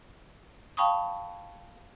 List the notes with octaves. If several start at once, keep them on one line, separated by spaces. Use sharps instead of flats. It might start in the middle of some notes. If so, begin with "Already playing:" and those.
F5 G5 A5 B5 C#6 D#6